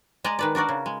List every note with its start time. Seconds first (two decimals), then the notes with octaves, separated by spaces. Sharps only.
0.24 G#3 D5 D#5 A#5
0.39 D#3 B4 D5
0.55 D4 F#4 A#4 D5
0.69 C#3
0.86 G#3